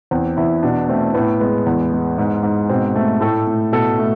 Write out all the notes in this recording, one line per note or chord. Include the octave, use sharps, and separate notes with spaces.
E2 C4
E2 E4
B2 D4
A3 C4
A2 B3
G#3 B3
E2
G#3
G#2
G#2
B2 C4
A3
A2 A4
A2
B2 A4
A3